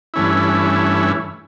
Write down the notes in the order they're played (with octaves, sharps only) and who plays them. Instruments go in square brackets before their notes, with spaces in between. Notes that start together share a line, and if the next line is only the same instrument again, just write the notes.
[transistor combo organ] G2 E3 A3 C#4 E4